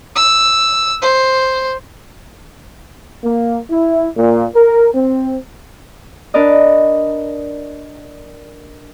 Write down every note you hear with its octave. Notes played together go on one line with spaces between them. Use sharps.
E6
C5
A#3
E4
A#2
A#4
C4
D4 A#4 B4 D5 D#5